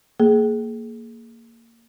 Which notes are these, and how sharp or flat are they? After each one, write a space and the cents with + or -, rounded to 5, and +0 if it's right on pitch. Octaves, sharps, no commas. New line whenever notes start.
A#3 -15 G#4 +20